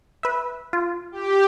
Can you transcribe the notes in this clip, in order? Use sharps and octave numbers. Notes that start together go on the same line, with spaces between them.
B4 E5
F4
G4